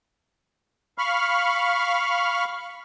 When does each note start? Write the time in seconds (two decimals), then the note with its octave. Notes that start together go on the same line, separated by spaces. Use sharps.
0.98 F5 B5 C#6 F6